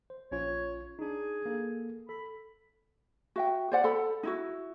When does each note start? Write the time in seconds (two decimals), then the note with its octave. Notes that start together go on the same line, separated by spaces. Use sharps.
0.10 C5
0.31 A#1 C#4 F4 C#5
0.99 D4 D#4 G#4
1.46 A#3 A4
2.09 A4 B5
3.36 F#4 E5 G5
3.72 C5 D5 F#5
3.84 A4 B5
4.23 D#4 E4 F#4